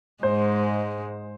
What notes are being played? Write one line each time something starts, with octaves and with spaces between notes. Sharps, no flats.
G#2 G#3 C5